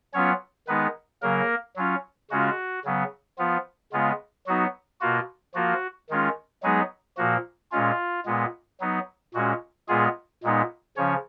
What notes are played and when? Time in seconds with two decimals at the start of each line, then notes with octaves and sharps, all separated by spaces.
0.14 F#3 B3 C#4 F4 C#5
0.67 D#3 G#3 B3 D#4 B4
1.22 C#3 F#3 A#3 A#4
1.76 F#3 C#4 F4
2.31 C#3 G#3 C#4 F4 F#4
2.85 C#3 F#3 B3
3.38 F3 B3 F4
3.93 C#3 G#3 B3 F4
4.47 F#3 B3 D#4 F#4
5.01 B2 A#3 F4 F#4
5.55 F3 A#3 F4 F#4
6.10 D#3 G#3 C#4 F4
6.63 F#3 G#3 B3 D#4 G#4
7.17 A#2 F3 A#3 F#4
7.72 A#2 G#3 C#4 F4
8.25 A#2 G#3 B3
8.80 F#3 B3 D#4
9.34 A#2 G#3 C#4 F#4
9.88 A#2 G#3 B3 F4 G#4
10.43 A#2 G#3 B3 D#4
10.97 C#3 F3 C#4 C#5